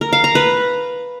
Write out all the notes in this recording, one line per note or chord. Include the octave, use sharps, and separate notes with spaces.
A#4
F5
A#5
B4